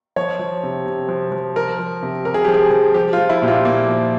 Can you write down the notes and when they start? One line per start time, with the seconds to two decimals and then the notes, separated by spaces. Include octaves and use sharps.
0.16 F3 C#5
0.39 F3
0.63 C3
0.86 C3
1.09 F3
1.32 F3
1.56 F3 A#4
1.79 F3
2.03 C3
2.25 C3 A#4
2.34 G#4
2.44 F3 G4
2.54 G#4
2.71 F3
2.94 F3 G4
3.13 F4
3.18 F3
3.29 E4
3.42 A#2 G4
3.48 F4
3.65 A#2 A#3
3.88 F3